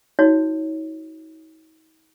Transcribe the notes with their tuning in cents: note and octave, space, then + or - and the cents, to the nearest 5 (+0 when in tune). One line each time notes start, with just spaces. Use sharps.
D#4 +40 F#4 +0 C#5 +0